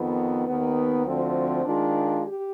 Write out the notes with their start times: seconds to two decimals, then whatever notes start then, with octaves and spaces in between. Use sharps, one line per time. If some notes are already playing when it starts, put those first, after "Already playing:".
Already playing: F2 D#3 B3
0.47 D#2 D#3 B3
1.06 D2 D3 F3 C4
1.64 D#3 G#3 D4 F4
2.24 G4